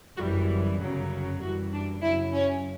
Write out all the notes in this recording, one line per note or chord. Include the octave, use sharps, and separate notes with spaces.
G1 F#2 E3 G3 F#4
G1 F#2 C#3 F#3
F#2 E3 G3 F#4
D4
F#2 C#3 F#3 E4
C#4